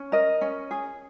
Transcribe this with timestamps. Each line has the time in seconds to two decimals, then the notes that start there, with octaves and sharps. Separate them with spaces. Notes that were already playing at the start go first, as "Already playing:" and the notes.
Already playing: C#4
0.12 A#4 D#5
0.41 C#4
0.71 G#4